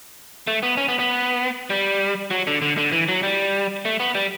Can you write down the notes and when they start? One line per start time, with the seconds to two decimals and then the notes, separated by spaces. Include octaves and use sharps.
0.47 A3
0.63 B3
0.77 C#4
0.88 B3
0.99 B3
1.70 G3
2.31 F#3
2.47 D3
2.62 D3
2.78 D3
2.92 E3
3.08 F#3
3.23 G3
3.85 A3
4.00 B3
4.15 G3